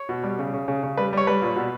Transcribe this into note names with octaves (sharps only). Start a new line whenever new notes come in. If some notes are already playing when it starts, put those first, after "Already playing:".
Already playing: C#5
B2
G3
C#3
C#3
C#3
C#3
G3 B4
G3 C#5
G3 B4
A#2
B2